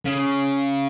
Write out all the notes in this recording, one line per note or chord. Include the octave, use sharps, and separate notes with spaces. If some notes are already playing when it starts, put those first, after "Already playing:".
C#3